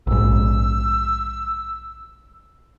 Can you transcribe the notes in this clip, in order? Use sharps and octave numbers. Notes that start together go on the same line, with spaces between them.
A#1 G#2 E6